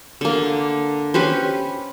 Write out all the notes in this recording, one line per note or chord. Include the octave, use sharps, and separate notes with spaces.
D3 A#3
C#4 G4 B4 C5